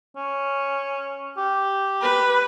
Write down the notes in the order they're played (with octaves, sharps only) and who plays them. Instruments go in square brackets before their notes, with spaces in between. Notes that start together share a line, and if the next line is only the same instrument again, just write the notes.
[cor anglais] C#4
G4
[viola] B4